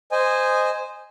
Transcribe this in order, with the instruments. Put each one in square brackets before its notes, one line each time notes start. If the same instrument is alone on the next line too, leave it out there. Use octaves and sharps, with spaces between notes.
[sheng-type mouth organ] C5 D#5 G#5